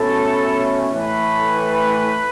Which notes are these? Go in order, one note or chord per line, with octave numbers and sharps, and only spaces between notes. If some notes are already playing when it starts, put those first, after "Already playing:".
Already playing: B2 A3 C#4 E4 A4
A2 E3 A3 B4